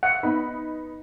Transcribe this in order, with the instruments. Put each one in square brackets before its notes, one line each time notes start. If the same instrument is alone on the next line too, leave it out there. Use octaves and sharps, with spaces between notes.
[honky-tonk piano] E5 [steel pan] F#5
[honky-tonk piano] B3 D#4 B5